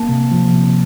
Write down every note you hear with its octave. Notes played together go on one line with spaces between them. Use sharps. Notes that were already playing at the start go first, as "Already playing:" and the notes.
Already playing: A#3 A5
C3
F3
C3